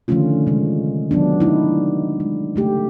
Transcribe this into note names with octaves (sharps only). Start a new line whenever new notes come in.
D3 D#3 F3 A3 C#4 F4
C3 G#3
D#3 F#3 B3 D4
A3 D#4 E4
G#3
C#3 A3 G4